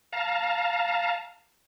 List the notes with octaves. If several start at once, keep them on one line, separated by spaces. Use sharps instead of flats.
F5 A5 A#5